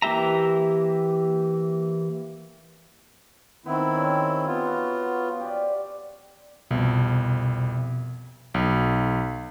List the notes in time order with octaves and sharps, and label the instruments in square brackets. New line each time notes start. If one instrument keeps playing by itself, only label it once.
[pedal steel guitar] E3 A#3 G4 E5 A#5
[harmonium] D#3 C4 E4 [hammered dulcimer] B3
[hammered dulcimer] C#4 G4 C5
[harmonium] B3 F4
[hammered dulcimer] F#4 F5 F#5
G4 D5
[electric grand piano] C2 F2 [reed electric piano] B2
[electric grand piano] B1